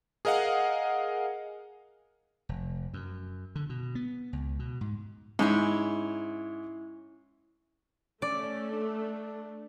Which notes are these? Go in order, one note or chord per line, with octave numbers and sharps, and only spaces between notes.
G#4 A#4 D#5 F5 F#5
F1
F#2
D3
B2
B3
C#2
B2
G#2
G#2 C#4 E4
A3 C#4 D5
D4